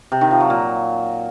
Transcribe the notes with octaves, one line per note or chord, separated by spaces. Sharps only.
C3
D#3
F3
F#3
A#2